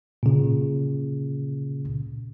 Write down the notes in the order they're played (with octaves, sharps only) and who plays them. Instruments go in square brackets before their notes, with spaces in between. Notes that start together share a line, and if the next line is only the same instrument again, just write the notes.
[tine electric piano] A#2 C#3